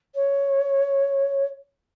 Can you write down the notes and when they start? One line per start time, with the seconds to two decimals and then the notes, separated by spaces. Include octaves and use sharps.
0.14 C#5